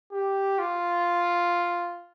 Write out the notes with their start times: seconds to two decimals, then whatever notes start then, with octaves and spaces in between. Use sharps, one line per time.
0.12 G4
0.59 F4